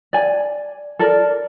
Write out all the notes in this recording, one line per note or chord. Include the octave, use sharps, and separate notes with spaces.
D5 G#5
A4 A#4 D5